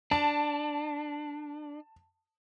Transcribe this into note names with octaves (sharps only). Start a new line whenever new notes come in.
D4 A5